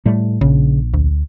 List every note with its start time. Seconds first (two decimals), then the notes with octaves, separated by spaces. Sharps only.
0.06 A2 G3 A3
0.41 A#1 C#3
0.94 D2